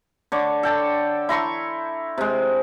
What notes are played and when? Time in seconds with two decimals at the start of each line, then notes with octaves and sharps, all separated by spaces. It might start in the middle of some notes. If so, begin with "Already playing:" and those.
0.32 D3 C#5 D5
0.63 A4 G5 A5
1.29 E4 A#5 C6 C#6
2.18 C3 G#3